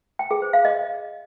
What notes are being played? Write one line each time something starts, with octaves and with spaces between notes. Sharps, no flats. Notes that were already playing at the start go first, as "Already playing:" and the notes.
G5
G#4
C5
F5
D#5